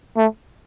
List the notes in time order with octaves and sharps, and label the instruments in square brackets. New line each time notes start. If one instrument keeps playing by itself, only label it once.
[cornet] A3